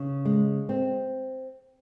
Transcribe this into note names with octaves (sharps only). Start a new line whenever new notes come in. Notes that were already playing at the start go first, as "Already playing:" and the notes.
Already playing: C#3
G#3
C4